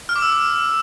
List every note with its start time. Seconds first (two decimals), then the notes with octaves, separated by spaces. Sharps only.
0.09 F6
0.16 D6
0.22 E6